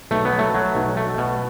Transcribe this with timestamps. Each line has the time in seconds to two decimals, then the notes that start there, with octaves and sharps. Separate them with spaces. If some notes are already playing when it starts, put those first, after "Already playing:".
0.11 B1 A3
0.25 B3
0.32 F#3
0.39 A3
0.54 F#3
0.75 B1
0.97 A3
1.18 B2